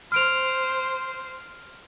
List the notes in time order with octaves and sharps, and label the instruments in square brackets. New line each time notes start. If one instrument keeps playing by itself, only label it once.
[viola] C5 [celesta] F6 D7 F7